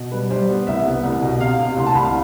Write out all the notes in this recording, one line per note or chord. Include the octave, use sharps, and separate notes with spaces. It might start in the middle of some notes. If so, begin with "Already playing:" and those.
Already playing: B2
G3 B4
G3 C5
B3
C2 E5
B3
C2
B2
C3 F5
C3
C2 C6
A5
C2 B5
F5